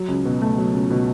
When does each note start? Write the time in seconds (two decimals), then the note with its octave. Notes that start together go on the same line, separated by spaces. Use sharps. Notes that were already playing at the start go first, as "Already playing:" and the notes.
Already playing: F#3
0.08 C#2
0.25 B2
0.42 A3
0.58 F#3
0.73 C#2
0.90 B2